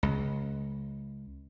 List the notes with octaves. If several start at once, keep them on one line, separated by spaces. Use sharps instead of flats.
C#2